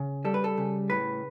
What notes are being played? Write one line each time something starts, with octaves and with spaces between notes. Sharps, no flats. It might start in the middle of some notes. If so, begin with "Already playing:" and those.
Already playing: C#3
G3 A4
B4
A4
C#3
A2 B4